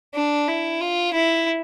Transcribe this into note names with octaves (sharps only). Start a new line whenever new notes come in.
D4
E4
F4
E4